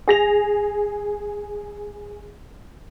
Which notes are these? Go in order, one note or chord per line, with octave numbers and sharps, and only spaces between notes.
G#4 A#6 F7